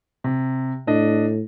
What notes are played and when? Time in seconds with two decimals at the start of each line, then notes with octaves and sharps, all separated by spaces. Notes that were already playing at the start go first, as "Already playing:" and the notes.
0.24 C3
0.87 A2 D4 D#5